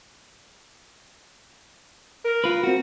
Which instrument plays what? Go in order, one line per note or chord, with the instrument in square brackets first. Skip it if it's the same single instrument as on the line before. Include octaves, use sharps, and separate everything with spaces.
[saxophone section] A#4
[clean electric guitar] F4 B4
C4 F#4